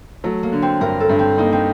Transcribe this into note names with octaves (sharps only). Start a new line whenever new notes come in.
F#3 A3
A#3
D3
C4
G2 A#4
A4
G2
C4
A#3 D#4
C4